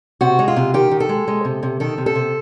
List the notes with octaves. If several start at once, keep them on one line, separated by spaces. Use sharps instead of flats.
C3 F#4
G#3
F4
C3
D#3 G4
D#3
A4
G#3
G#3
C3
C3
D#3 A4
C3
A4
C3